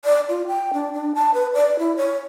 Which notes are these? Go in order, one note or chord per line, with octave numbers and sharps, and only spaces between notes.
D5
F4
G5
D4
D4
A5
B4
D5
E4
C#5